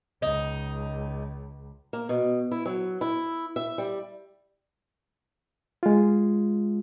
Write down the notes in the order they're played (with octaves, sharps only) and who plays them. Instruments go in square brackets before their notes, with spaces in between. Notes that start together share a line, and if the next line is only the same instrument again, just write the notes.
[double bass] C#2 [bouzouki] D#4
[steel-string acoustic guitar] A#3
B2
E4
F#3
E4
E5
G3
[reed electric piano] G#3 F4